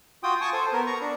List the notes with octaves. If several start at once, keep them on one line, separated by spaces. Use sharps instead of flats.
F4 F#4 G5 D#6
G#5 A5 C#6 D#6
A4 C5
B3 A#4
A#5 C#6
D4